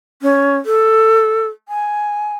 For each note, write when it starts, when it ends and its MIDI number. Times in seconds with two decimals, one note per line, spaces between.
0.22 0.56 61
0.66 1.47 69
1.69 2.37 80